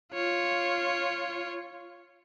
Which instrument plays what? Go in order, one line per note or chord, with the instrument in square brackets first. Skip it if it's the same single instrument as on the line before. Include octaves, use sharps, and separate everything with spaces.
[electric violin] F4 C#5